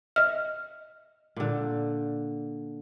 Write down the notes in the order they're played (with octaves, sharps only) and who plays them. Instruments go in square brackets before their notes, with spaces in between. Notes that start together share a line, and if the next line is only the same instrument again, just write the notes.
[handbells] D#5 E5 [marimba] F6
[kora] A#2 D3